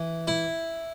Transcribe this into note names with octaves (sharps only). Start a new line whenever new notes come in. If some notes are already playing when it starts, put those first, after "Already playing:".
Already playing: E3
E4